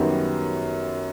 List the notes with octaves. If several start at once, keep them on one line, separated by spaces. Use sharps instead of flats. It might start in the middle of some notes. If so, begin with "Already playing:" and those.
Already playing: F#2 D#3 G3 B3 F#4